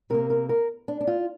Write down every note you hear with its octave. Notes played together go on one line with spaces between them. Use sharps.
C3 A#3 A#4
A#4
A#4
D4
D4
F4